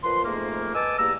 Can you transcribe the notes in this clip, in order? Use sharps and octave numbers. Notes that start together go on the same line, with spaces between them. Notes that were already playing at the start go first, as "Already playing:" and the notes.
A#2 F3 B4 C6
F2 G#2 A3 A#3
B4 D#5 G#5 A5 D6 E6
E2 G3 A#3 A#5 E6